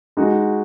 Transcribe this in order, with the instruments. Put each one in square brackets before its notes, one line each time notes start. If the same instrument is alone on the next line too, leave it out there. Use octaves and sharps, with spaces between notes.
[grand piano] G#3 D#4 F#4